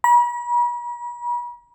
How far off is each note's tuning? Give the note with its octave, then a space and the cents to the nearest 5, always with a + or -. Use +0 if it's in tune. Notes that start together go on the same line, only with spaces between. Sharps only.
B5 -45